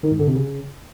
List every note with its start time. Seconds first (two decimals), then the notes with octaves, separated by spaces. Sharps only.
0.03 D#3
0.11 G#2
0.19 D3
0.27 C3
0.35 C#3